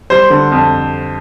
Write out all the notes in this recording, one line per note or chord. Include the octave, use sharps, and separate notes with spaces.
G3 C5
D3
F2